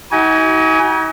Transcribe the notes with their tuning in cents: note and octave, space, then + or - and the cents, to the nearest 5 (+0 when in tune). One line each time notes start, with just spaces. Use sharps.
D#4 +45 F#4 +40 G#5 +0